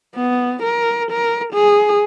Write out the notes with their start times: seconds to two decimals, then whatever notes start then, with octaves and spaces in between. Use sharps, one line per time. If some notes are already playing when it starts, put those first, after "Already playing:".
0.16 B3
0.63 A#4
1.12 A#4
1.54 G#4